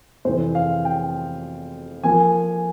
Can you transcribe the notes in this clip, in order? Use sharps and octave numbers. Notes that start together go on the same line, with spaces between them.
F2 C3 E3 C5
F5
G5
F3 A#3 G#5